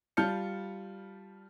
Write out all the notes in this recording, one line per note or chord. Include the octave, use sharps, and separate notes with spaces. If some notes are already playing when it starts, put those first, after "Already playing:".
G3 F4 A5 F6 G6 C#7